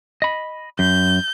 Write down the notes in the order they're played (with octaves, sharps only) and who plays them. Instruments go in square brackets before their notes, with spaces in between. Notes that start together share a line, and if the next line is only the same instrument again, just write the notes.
[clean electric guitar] D#5 B5
[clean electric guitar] F#2 [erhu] G6